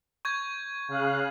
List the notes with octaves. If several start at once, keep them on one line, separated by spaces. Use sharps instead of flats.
C#6 G6 G#6
C#3 F5 F#6